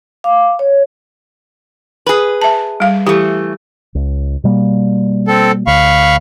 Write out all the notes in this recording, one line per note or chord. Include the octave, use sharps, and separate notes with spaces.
F5 D6
C#5
G#4 B4
E5 A5
G3 F5
E3 A3 G4
C#2
B2 G3 A#3
C4 A4
D2 F5 B5 C#6